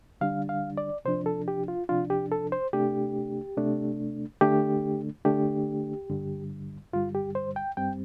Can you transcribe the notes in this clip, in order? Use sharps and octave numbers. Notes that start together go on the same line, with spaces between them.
D3 G3 D4 F5
F5
D5
C3 F3 D4 C5
A4
G4
F4
C3 F3 D4 F4
G4
A4
C5
C3 A3 D4 G4
C3 A3 D4
D3 A3 D4 G4
D3 A3 D4 G4
G2 D3 G3
G2 D3 G3 F4
G4
C5
G5
G2 G3 C4 G5